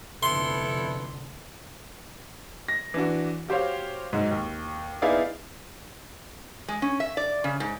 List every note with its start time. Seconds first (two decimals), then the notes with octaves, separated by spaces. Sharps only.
0.23 F1 F2 D3 B3 E4 A4 C6
2.68 A#6
2.94 E3 D4 F#4
3.48 F#4 G4 C5 C#5 F5
4.13 G#2 F#3 G#3 F#4
4.31 D#2
5.02 B3 D#4 E4 G#4 D5 F5
6.68 G#3
6.82 C#4
7.00 E5
7.17 D5
7.44 C#3
7.60 G#2